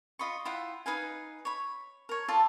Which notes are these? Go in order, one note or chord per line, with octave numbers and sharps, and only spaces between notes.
F4 D#5 B5 C#6
E4 F4 F#5 G5
D#4 B4 F5 G#5
C#5 B5
A#4 C#5
F4 A4 D5 A5